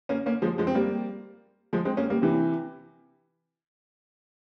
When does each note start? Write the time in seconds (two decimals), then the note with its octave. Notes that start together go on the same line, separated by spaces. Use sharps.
0.09 A#3 C#4
0.26 A#3 C#4
0.42 F3 G#3
0.58 F3 G#3
0.67 C4
0.75 G3 A#3
1.73 F3 G#3
1.85 G#3 C4
1.97 A#3 C#4
2.10 G3 A#3
2.22 C3 E3